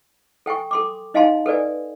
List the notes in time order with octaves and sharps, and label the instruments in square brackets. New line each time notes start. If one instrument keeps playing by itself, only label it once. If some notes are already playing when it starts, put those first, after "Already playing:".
[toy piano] A4 G5 G#5 C#6
A4 C6 D6
D#4 D#5 F5 G#5 A5 C6
A4 B4 D5 G#5